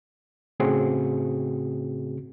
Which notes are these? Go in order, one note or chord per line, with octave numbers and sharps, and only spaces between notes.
A2 C#3 A3 C4 F#4 G#4